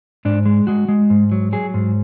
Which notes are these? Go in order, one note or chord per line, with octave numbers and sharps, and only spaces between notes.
G#2 D4
G#3
G#3 F#4
G#3
G#2
F#3
F#3 G#4
G#2